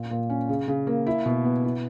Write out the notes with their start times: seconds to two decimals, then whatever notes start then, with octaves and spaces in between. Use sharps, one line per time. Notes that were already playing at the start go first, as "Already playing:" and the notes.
Already playing: A#2 A#3
0.11 A#2
0.30 C#4
0.49 C#3
0.68 C#3
0.87 A#3
1.06 E4
1.26 B2
1.44 B3
1.64 E4